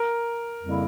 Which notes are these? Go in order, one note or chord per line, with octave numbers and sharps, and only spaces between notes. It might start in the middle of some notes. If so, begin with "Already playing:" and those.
Already playing: A#4
F2 C#3 G3 A#3 E4